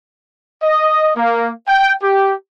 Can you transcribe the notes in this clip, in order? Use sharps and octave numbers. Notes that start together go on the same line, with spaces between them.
D#5
A#3
G5
G4